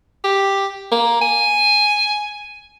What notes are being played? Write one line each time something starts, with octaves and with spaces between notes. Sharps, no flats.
G4
A#3
G#5